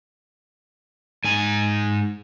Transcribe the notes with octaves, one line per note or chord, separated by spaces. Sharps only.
G#2 G#5